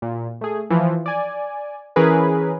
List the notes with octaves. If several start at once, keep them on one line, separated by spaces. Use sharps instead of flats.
A#2
A3 G#4
E3 F3
D5 G#5
E3 C#4 G#4 A#4 B4